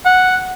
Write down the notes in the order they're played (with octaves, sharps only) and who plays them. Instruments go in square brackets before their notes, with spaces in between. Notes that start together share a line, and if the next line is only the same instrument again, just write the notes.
[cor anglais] F#5